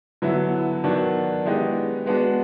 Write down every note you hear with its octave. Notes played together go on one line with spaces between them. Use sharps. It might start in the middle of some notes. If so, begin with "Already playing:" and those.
D3 F#3 B3 E4
D#3 F#3 B3 D4 F#4
E3 G#3 B3 D#4 G4
G#3 B3 D4 F#4